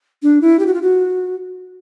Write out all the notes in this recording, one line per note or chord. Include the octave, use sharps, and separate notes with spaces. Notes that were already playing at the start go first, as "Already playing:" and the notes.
D4
E4
G4
F#4
F4
F#4